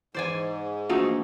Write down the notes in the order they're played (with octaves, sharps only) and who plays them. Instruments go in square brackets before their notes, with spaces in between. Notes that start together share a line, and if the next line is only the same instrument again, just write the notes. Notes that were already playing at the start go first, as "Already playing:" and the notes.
[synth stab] E2 E3 [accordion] G#2 [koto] C5 D5 G#5
[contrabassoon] A#1 [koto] E3 A3 D#4 [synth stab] F4 F#4